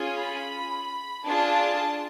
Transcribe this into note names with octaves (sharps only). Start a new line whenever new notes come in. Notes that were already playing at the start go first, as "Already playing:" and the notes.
Already playing: C#4 F4 G#4
B5
D4 F4 G#4 A5